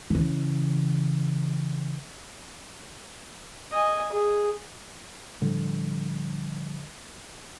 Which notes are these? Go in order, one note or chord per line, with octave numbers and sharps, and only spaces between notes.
C#3 E3
D#5 G#5
G#4
A2 D3 F3 G3